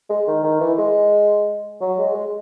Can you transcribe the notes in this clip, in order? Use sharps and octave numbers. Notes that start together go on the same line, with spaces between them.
G#3
D#3
D#3
E3
G#3
F#3
G#3
G#3